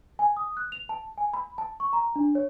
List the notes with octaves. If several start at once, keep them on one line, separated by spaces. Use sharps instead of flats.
G#5
D#6
F#6
F7
A5
G#5
B5
A5
C#6
A#5
D4
C#5